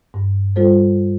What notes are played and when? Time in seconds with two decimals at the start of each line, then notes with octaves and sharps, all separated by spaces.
0.14 G2
0.56 G3 F4 A4 C5